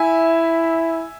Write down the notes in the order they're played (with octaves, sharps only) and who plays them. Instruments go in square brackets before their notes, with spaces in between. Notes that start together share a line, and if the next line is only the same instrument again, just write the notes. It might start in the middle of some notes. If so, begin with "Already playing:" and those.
Already playing: [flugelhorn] E4 [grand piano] E5 G#5